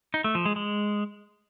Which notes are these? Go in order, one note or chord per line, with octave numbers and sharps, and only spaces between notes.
D#4
A3
F3
G#3
G#3